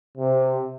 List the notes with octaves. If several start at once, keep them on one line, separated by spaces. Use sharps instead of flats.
C3